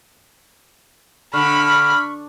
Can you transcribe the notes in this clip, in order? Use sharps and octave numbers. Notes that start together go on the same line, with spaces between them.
D3 B5 C#6 F6